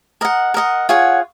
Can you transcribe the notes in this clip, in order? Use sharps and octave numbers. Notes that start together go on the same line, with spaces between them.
A#4 D#5 F#5
A#4 D#5 F#5
F4 G#4 C#5 F#5